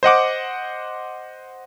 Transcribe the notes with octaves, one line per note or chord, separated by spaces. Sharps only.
C5 D#5 F#5 D6